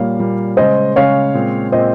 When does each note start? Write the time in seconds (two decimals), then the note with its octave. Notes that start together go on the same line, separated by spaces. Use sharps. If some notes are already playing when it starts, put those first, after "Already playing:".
Already playing: A#2 G3 A#3 C#5 F5
0.19 A#2 G3 A#3
0.57 C#3 G#3 C#4 C5 D#5
0.96 C#3 G#3 C#4 C#5 F5
1.34 A#2 G#3 C4
1.72 A#2 G#3 C4 C5 D#5